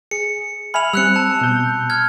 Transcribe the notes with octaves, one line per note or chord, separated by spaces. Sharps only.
G#4 C#7
E5 G#5 B5 F6 F7
G3 C4 E6 F#6 C#7
A5
B2 G6
F6 G#6